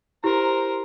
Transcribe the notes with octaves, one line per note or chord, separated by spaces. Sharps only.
E4 G4 A#4 C5